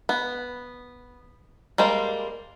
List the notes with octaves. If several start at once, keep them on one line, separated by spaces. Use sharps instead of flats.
B3
G3 G#3 A#3 C5